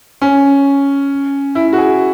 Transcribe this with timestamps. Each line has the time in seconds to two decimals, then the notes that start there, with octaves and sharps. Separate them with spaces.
0.22 C#4
1.55 E4
1.73 F#4
1.78 G#4